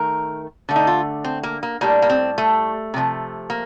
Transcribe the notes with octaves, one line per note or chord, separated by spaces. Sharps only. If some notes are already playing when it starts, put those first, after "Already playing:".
Already playing: D#3 A3 A#4
D3 A3
D#4
F4
C4
A#3
A#3
A2 G3 A#3
A#3
C4
A3
C3 F3 A3
A#3